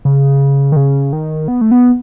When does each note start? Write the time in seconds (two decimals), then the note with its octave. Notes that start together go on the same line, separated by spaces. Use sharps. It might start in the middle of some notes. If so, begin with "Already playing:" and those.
0.05 C#3
0.72 D#3
0.76 C#3
1.13 D#3
1.48 B3
1.61 A3
1.71 B3